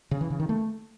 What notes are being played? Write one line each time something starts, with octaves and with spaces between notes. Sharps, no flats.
C#3
E3
C#3
D#3
A3